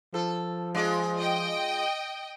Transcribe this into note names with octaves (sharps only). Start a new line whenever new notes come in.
F3 A4
G#3 F4 D5
D#5 G5